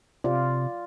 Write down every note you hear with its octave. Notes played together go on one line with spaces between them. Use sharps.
C3 F4 D5